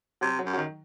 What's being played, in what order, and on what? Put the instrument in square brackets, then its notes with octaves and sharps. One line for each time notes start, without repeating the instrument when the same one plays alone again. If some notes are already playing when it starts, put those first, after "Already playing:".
[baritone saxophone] C3 [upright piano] F#3
[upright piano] F#3
[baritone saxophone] F#2
[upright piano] F#3
D#3